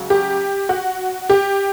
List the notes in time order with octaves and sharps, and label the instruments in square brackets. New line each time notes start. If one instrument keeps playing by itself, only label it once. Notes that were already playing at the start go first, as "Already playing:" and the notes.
Already playing: [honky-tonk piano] C#2 C#3 F#3
G4
F#4
G4